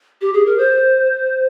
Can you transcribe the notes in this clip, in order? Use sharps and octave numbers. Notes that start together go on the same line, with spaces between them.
G4
G#4
A#4
C5